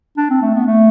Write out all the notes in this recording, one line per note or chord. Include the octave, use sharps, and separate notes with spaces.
D4
C4
A3
B3
A3